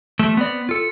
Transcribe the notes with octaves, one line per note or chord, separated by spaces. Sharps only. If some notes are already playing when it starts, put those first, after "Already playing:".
F3 G3 A3
B3 C4 D5
F4 A4